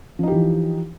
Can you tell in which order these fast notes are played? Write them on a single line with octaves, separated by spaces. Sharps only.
F3 D#4 G4 E3